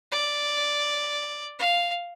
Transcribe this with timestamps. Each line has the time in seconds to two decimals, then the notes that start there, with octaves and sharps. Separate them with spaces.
0.12 D5
1.59 F5